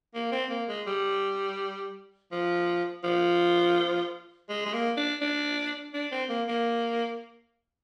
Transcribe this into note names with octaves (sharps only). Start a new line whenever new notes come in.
A#3
C4
A#3
G#3
G3
F3
F3
G#3
G#3
A#3
D4
D4
D4
C4
A#3
A#3